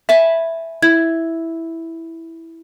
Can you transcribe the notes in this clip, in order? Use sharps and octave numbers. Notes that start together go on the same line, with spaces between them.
E5 G#5 A5 B5
E4 G#6